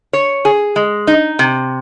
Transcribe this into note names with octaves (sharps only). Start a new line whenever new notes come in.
C#5
G#4
G#3
D#4
C3